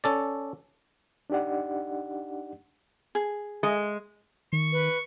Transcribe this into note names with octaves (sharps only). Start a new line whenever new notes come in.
C#4 A4 D5
D4 D#4 G4 D5 F#5
G#4
G#3
D#3 C#6
B4